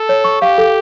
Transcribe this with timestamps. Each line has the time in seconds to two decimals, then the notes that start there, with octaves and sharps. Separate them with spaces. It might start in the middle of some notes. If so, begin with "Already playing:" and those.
Already playing: A4
0.09 C#5
0.24 C#6
0.41 G4 F5
0.58 A4